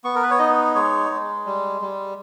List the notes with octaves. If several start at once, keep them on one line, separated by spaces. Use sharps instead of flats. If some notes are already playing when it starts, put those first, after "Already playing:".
B3 C#6
A#4
B4
C#5
D#4 D#5
G#3 C#5
G#3
G3
G3